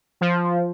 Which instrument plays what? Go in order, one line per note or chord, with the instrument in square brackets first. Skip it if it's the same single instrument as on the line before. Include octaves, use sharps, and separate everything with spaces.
[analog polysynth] F3